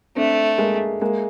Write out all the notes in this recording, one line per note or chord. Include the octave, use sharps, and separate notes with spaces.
A3 C4 D4
G#3 A#3
G#3 A#3